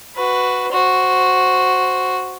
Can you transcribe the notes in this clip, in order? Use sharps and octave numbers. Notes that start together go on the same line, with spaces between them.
F#4 B4
F#4 C5